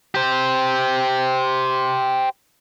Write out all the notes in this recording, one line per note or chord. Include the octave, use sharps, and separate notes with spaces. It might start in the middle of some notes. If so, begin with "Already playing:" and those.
G4 C5